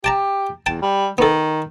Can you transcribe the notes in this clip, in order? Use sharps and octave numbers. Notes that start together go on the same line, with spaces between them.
G4 G5 A5 A#5
E2 G5 A5
G3
D#3 B3 A4